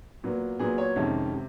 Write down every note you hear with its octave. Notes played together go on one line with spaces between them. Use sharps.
A#2 F#3 B3
A#2 F#3 B3 G#4
C#5
F2 C3 D#3 G#3 C#4 E5
C3